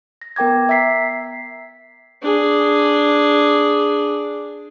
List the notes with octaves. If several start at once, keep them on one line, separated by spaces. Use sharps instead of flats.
A#6
B3 A#4 G5 D6 G#6
E5 A#5 B6 C7
D4 G#4